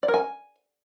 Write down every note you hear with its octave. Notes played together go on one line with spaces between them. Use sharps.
D5
A#4
G#5